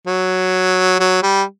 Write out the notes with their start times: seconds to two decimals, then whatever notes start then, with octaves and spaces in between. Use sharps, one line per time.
0.07 F#3
1.00 F#3
1.22 G3